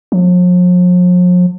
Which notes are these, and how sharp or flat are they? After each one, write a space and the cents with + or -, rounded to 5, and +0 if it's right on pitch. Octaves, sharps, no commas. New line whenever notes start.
F3 +45